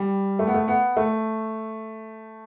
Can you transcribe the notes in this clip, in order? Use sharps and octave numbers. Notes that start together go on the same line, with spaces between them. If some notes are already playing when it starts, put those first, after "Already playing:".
Already playing: G3
A3
B3
A3
B3
A3